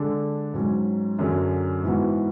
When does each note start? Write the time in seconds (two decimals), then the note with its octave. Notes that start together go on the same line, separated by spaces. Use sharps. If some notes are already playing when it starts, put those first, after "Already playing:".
Already playing: D3 G#3 D4 A4
0.54 G#2 F#3 C#4
1.19 F#2 D3 F#3 C#4 G#4
1.84 G#2 E3 B3 F#4